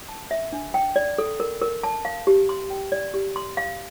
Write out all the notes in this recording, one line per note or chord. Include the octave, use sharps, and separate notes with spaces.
A5
E5
D4
G5
D5
A4
A#4
A#4
A5
F5
G4
C6
G5
D5
G4
C6
F5